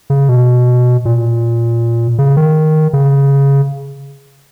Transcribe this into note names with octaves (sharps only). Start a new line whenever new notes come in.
C#3
B2
A#2
C#3
D#3
C#3